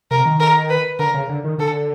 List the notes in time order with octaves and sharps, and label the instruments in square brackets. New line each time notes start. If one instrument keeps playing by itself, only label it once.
[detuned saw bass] C3 [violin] A#4
[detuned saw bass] D#3
[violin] A#4
B4
[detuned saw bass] D3 [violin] A#4
[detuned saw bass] C#3
D3
D#3
[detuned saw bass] D3 [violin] A4